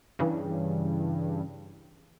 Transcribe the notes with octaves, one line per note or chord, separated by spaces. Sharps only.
G2 C#3 E3